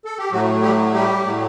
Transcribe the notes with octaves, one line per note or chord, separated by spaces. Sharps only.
A4
G4
A2 F#3 A3 F#4
G3 G4
G3 G4
A2 F#3 A3